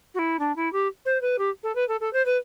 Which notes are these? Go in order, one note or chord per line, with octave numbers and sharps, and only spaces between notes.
F#4
E4
D4
E4
G4
C5
B4
G4
A4
B4
A4
A4
C5
B4